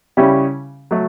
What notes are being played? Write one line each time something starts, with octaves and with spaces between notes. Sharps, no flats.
C#3 G3 C#4 E4 G4
F#3 A3